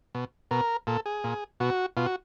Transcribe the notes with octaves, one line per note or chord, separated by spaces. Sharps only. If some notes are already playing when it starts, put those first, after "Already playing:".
B2
B2 A#4
A#2 A4
G#4
A#2
B2 F#4
B2 F4
F#4